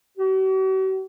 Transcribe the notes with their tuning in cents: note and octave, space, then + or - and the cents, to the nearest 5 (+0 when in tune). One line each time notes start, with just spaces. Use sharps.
F#4 +45